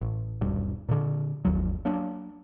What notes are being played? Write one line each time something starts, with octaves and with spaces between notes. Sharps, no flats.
A1
D#1 B1 G2
A#2 D3
G1 D#2 F3 F#3
F#3 A#3 D4